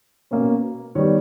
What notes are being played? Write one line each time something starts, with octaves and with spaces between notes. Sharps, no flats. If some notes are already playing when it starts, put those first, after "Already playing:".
B2 A#3 C#4 C#5
D#3 G3 B3 C#5